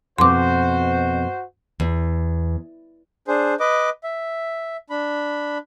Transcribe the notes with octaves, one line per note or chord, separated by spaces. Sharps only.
F2 B2 C4 F#4 C5 C6 D6
E2
D4 G#4 C5
B4 D#5 D6
E5
D4 B5